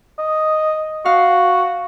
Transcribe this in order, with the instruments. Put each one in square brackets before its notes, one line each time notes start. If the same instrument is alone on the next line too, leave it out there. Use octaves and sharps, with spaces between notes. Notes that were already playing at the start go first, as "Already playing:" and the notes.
[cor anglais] D#5
[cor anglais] F#4 [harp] F5